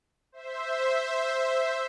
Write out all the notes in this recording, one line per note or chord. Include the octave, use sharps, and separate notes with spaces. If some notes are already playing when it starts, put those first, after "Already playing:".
C5 E5